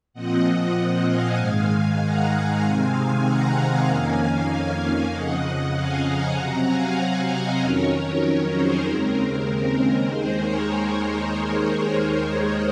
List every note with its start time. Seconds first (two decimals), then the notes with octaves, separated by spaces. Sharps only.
0.13 A#2 F3 C4 D#5 F#5
1.06 F5 G#5
1.37 G#2 D#3 G#3
2.00 F#5 A#5
2.30 F5 G#5
2.63 C3 D#3 G#3 C4
2.93 F5 G#5
3.24 F#5 A#5
3.86 F2 D#3 A#3 C#4 F5 G#5
4.18 F5 G#5
5.11 F2 C#3 F3 D#5 F#5
5.73 F5 G#5
6.03 F#5 A#5
6.35 C3 F#3 C4
6.66 F5 G#5
7.28 D#5 F#5
7.59 F2 D#3 F#3 C#4 A#4 C#5
7.91 A#4
8.21 A#4
8.52 G#4 C5
8.83 D#2 C#3 G#3 C4 A#4
9.15 A#4
9.76 A#4
10.08 D#2 D#3 G#3 G#4 C5
10.38 A#4 C#5